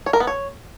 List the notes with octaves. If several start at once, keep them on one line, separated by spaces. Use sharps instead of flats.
C#5
A#4
B3
C#5